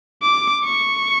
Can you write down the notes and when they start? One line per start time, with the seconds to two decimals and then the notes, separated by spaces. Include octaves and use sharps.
0.22 D6
0.64 C#6